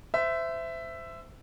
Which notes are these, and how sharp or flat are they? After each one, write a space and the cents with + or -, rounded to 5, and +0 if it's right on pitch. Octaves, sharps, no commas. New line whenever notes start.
C5 -25 E5 +10